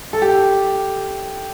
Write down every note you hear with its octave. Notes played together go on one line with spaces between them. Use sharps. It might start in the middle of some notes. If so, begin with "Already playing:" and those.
A4
G4